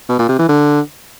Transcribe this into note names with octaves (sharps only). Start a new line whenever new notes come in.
B2
A#2
C3
E3
D3